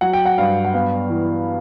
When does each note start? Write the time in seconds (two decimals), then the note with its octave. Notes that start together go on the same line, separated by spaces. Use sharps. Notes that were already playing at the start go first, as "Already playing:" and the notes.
0.01 F#3 F#5
0.13 G5
0.26 F#5
0.38 G2 F5
0.65 F#5
0.74 B3 F5
1.10 E3